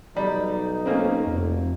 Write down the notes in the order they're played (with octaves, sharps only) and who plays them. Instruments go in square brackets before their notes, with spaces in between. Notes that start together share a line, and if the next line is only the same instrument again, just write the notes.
[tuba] B1 [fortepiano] G3 [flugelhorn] D#4
[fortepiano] A3 A#3 C4 [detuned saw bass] C#4
[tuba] F1 [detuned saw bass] F2